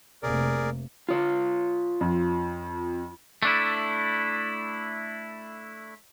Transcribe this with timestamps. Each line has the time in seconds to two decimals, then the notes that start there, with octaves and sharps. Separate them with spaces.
0.23 F1 A#3 G#4 A#4 D5
1.09 F4 C#5
2.01 F2
3.43 A3 D4 E4